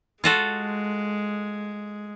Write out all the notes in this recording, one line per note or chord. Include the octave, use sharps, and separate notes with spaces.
G#3 F4 F#4 A4